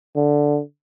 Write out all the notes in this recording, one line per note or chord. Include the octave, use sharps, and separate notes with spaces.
D3